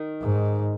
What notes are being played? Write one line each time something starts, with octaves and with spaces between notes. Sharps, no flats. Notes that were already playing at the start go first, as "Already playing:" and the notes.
Already playing: D#3
G#2